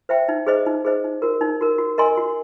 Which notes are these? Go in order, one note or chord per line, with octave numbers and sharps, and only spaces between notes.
C5 E5 G5
D#4
G#4 C5 D#5
D#4
G#4 C5 D#5
D#4
F#4 A#4
D#4
F#4 A#4
F#4
A#4 D#5 G#5 C6
F#4